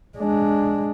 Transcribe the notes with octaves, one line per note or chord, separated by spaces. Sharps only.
G#3 D4